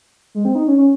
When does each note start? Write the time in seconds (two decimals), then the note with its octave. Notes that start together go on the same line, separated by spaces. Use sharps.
0.35 G#3
0.45 C4
0.55 D#4
0.67 C#4
0.78 C#4